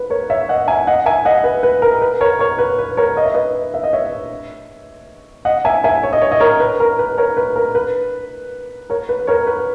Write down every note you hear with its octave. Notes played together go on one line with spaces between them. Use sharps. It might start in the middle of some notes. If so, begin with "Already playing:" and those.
Already playing: B4
A#4 C#5
C#5 E5
D#5 F#5
E5 G#5
D#5 F#5
E5 G#5
D#5 F#5
B4
B4
A#4
B4
A#4 C#5
A#4 C#5
B4
B4
A#4 C#5
D#5
E5
B4 D#5
E5
D#5
C#5 E5
D#5 F#5
E5 G#5
E5 G#5
C#5
D#5
C#5
D#5
A#4 C#5
B4
A#4
B4
A#4 C#5
B4
A#4
B4
A#4 C#5
B4
A#4 C#5
A#4
B4